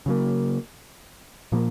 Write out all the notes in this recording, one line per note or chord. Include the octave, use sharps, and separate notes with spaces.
C#3 F#3 A#3
A#2 F3 A#3